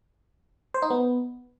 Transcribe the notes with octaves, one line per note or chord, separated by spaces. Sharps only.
C5
D#4
B3